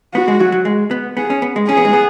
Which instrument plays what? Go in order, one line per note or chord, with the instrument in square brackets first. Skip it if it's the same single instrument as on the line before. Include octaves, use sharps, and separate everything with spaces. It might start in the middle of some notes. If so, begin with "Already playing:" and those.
[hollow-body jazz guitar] B3 [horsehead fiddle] F#4
[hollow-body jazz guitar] G#3
F#3
F#3
G#3
B3
[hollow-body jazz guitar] B3 [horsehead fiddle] G#4
[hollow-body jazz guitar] C#4
B3
G#3
[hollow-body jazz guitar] C#4 [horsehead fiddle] G#4
[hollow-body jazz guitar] B3
G#3
B3